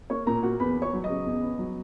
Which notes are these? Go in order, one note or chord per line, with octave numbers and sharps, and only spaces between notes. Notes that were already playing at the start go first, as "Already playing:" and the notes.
A#3 C#5 C#6
A#2 A#4 A#5
A#3 F#4 F#5
E2 B4 B5
B3
C#5 C#6
F#3
D#5 D#6
C#3
E2
B3
F#3